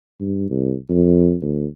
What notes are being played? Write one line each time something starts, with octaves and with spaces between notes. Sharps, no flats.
G2
C2
F2
D2